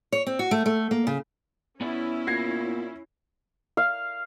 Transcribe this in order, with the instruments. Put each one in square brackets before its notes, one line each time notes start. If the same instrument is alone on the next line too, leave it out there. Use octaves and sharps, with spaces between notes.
[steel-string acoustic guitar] C#5
C4
F#4
A3
A3
A#3
C#3
[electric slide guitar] B3 D5 [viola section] C#4 E4
[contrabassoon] A#2 [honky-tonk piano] G#6 A#6 C7
[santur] F5